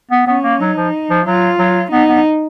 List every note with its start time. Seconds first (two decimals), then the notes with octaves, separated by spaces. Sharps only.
0.11 B3
0.26 B3 C#4
0.43 A#3
0.60 F#3 D#4
0.77 F3
1.10 F3
1.26 F#3 F4
1.59 F#3
1.92 B3 D#4
2.08 B3